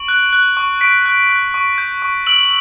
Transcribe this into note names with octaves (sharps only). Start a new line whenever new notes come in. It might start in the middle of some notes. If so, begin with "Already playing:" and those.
Already playing: C#6 D7 F#7
F#6
F#6
C#6
C#6 B6 D7
F#6
F#6
C#6
G6
C#6
E6 D7 F#7